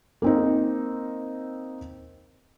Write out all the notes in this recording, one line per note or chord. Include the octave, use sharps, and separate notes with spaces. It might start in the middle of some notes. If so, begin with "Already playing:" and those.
A#3 C4 D#4